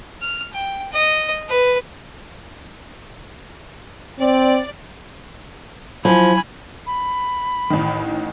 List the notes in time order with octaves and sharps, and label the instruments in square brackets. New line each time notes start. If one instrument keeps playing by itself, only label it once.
[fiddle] F6
G5
D#5
B4
[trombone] C4 [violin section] D5
[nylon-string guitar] F3 [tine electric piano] F#3 E4 [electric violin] G#5 B5
[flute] B5
[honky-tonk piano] A1 D#3